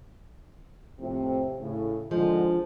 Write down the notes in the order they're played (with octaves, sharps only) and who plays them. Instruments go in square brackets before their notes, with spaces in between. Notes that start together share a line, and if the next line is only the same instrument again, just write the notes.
[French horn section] F2 A2 C3
A2 C#3
[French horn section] G#2 D3 G#3 [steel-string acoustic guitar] F3